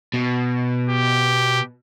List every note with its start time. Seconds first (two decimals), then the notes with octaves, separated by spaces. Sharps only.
0.14 B2
0.90 G4